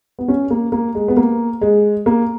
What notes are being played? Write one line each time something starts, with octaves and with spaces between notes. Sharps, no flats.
B3
C#4
A#3
A#3
G#3
B3
A#3
G#3
A#3